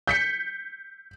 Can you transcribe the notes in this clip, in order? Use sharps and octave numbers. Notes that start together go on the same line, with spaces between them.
G6 B6 C#7